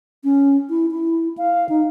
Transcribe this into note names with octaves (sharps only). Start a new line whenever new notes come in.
C#4
E4
E4
F5
D#4